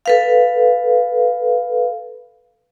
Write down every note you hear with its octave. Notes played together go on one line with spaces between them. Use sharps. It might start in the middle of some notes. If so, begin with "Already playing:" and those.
A4 B4 F5